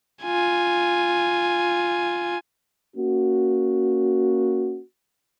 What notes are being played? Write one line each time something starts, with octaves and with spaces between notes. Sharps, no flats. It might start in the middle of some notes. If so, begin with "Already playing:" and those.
F4 G#5
A#3 C#4 F#4